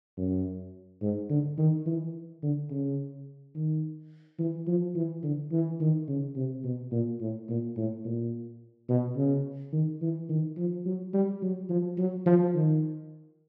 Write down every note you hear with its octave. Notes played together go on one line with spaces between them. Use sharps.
F#2
G#2
D3
D#3
E3
D3
C#3
D#3
E3
F3
E3
D3
E3
D#3
C#3
C3
B2
A#2
A2
A#2
A2
A#2
B2
C#3
D#3
E3
D#3
F3
F#3
G3
F#3
F3
F#3
F3
D#3